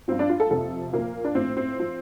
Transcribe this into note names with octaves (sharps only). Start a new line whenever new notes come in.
G2 F3 C4
D4
F4
A4
F2 C3 F3 A4
A#2 F3 A#3
D4
A2 F3 C4
C4
F3